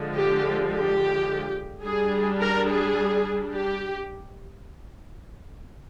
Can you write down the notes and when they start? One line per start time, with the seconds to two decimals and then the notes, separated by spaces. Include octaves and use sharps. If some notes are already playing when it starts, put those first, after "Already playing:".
Already playing: D3 F3 G#3
0.15 G4
0.72 G4
1.84 G3 D4 G#4
2.41 A#4
2.69 G#4
3.54 G4